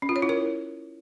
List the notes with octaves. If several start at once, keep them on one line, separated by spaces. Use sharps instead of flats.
C#4
F4
C#5
E4
A#4